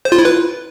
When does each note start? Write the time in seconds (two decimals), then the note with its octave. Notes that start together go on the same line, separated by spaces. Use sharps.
0.05 C5
0.12 F4
0.19 E4
0.25 B4